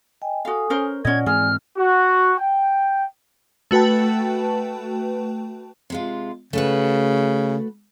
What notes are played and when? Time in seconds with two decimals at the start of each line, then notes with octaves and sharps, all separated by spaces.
0.22 D#5 G5 G#5
0.45 F#4 A4 F5 G#5 D#6
0.70 C#4 A#4 C5
1.05 A#2 C#4 D5 D#5 F#5 G#6
1.26 G#2 E3 C4 G#4 D5 F6
1.77 F#4
2.39 G5
3.71 A3 F#4 B4 G5 A5
5.90 C3 G#3 F4
6.53 C#3 A3 F#4 B4